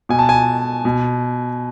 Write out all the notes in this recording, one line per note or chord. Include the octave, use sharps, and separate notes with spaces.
B2 G#5
A5
G#5
B2